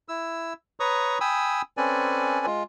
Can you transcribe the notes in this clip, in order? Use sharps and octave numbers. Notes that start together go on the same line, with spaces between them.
E4 E6
B4 C#5 A#5 C#6 D#6
G5 G#5 B5 D#6 E6
C4 C#4 A4 B4 D5 G#5
G#3 F4